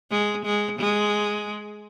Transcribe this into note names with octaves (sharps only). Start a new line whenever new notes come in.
G#3
G#3
G#3